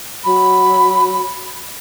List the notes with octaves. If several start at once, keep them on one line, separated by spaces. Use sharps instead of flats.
F#3 B5